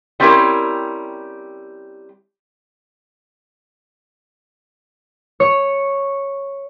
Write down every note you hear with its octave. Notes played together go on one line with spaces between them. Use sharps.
G3 C4 C#4 E4 G4 A#4
C#5